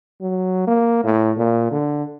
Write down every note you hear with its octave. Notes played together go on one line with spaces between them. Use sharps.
F#3
A#3
A2
A#2
D3